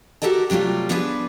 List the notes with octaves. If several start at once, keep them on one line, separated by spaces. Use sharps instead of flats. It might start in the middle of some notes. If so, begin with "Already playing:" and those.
F#4 G4 A4 A#4 D#5 A5
C3 F#3 G3 A3 F4
F3 B3 D4 G#4 B4